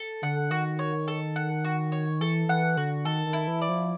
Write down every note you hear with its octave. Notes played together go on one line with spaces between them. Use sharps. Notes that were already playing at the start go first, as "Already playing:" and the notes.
Already playing: A4
D3 F#5
D#3 F#4
C#5
A4
F#5
F#4
C#5
E3 A4
E3 F#5
D3 F#4
D#3 A4
D#3
E4
E3
D5
F3